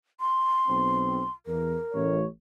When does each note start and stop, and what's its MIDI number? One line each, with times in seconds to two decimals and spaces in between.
0.20 1.31 84
0.68 1.21 35
0.68 1.21 60
1.46 1.75 40
1.46 2.15 70
1.93 2.24 33
1.93 2.24 73